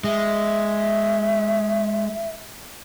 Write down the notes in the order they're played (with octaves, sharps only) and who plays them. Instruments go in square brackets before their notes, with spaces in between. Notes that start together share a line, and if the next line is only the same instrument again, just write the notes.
[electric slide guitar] G#3 [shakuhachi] E5